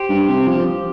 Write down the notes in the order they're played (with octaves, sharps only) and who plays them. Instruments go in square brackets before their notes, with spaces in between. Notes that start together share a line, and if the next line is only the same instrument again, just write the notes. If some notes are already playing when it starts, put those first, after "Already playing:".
Already playing: [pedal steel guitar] G4 C5
[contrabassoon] G2
C3
F3